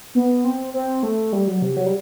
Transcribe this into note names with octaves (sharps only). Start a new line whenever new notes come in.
B3
C4
C4
A3
G3
F#3
C3
F#3
G3